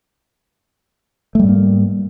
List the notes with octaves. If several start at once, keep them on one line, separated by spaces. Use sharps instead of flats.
G#2 G3 A3 A#3